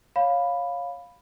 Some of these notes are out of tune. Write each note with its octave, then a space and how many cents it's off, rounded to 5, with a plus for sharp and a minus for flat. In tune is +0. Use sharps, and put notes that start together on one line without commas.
C#5 +0 F5 +10 B5 +0